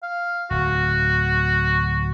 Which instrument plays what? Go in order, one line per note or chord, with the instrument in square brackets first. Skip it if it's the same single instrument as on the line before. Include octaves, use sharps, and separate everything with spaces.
[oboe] F5
[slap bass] D1 [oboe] F#4